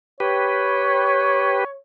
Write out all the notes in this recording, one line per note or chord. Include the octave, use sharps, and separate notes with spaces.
G4 B4 C#5